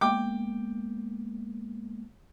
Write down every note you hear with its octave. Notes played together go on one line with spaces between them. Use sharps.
G#3 A#3 B3 G5 D6